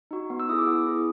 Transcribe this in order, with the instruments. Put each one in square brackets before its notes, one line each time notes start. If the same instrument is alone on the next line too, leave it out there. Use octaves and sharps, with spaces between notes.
[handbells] D#4 F#4
B3
E6
E4 G#4 D#6
D6
B3
E4 G#4